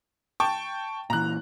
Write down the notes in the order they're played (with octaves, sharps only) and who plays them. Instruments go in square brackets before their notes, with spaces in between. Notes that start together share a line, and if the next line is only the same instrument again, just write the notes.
[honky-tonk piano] G5 A5 C#6
[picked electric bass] A#2 E3 [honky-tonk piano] A#5 F#6